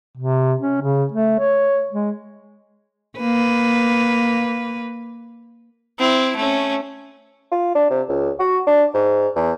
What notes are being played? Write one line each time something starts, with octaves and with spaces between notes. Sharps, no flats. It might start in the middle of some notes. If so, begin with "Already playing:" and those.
C3
C#4
C#3
A3
C#5
G#3
A#3 B4
C4 E4
A3 C#4
F4
D4
C3
C#2
F#4
D4
G#2
E2